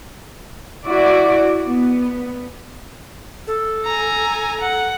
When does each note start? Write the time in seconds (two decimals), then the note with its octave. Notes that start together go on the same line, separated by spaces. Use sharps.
0.84 E4 F#4 D5
1.66 B3
3.47 A4
3.85 G#5 A#5
4.61 F#5